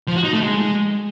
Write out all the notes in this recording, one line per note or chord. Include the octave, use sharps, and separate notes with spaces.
F3
F#4
D#4
A3
G#3